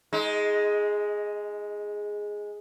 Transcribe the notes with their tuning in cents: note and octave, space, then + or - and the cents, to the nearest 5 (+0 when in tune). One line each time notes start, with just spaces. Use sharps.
G#3 +0 D#4 +35